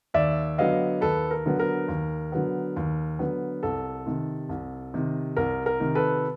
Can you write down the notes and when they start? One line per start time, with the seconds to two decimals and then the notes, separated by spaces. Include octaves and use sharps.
0.14 D#2 D5 E5
0.58 D3 F#3 B3 D#5 F5
1.01 D#2 A4 B4
1.31 A#4
1.46 D3 F#3 B3
1.60 A#4
1.88 D#2
2.32 D3 F#3 B3
2.76 D#2
3.19 D3 F#3 B3
3.63 C2 A4
4.06 C3 D#3
4.49 C2
4.94 C3 D#3
5.37 C2 A#4
5.66 A#4
5.80 C3 D#3
5.95 A4 B4